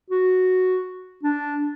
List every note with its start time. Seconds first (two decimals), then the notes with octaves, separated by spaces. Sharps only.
0.10 F#4
1.23 D4